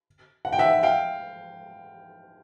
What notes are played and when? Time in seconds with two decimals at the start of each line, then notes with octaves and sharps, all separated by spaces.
0.45 F#5
0.53 G5
0.59 E5 F#5
0.83 F5 G5